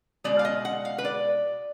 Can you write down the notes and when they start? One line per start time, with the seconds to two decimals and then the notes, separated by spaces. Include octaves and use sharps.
0.24 B2 G#3 D5
0.39 F5
0.45 D#5
0.65 F#5
0.85 F5
0.98 B4
1.04 D5